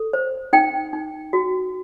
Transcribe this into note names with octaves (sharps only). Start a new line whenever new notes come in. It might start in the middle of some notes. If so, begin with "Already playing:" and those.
Already playing: A4
C5
D#4 G5
D#4
F#4